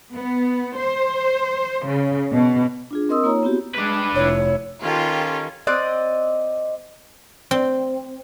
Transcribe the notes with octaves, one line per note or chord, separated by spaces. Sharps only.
B3
C5
C#3
B2
D4 F4 G#4
C4 A#4 D#5 C6 D#6 E6
A#3 D#4 F4 C#5 A#5
B3 C4 E4 F#4 G4
G#3 D4 B4
F1 E4 C#5
D#3 C#4 F4 G4 A4
C4 D5 D#5 F#6
C4